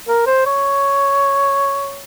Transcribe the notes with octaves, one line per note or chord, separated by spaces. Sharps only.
A#4
C5
C#5